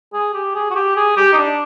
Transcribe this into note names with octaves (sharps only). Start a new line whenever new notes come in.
G#4
G4
G#4
F#4
G4
G#4
G4
D#4
D4